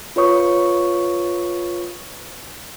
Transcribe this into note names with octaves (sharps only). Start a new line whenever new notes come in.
F4 B4 C#5 C#6 D#6